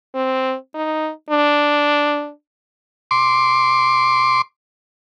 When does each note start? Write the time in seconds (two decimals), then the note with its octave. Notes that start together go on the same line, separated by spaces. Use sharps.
0.15 C4
0.75 D#4
1.30 D4
3.11 C6 D6